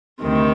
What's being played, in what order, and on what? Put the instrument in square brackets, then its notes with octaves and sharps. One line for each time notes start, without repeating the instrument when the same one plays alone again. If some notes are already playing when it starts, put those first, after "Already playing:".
[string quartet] D2 C3 D#3